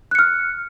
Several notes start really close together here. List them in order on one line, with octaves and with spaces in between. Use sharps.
F#6 C#7 F6